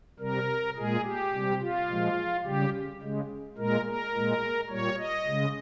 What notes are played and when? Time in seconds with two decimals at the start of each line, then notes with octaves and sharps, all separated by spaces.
0.19 C3 G3 A#4
0.76 A#2 G#3 G#4
1.04 G4
1.33 C3 G3
1.61 F4
1.88 A#2 F3 G#3
2.44 C#3 G3 G4
3.01 C#3 G#3
3.57 A#2 G#3 A#4
3.85 A#4
4.13 A#2 G#3
4.69 A#2 G3 C#5
4.98 D#5
5.26 C#3 G#3